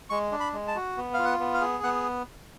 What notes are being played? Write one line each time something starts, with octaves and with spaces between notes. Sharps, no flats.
G#3 C#6
D4
B5
G#3
A5
F#4
B3
F5
F4
F#5
B3
F5
G#4
B3 F#5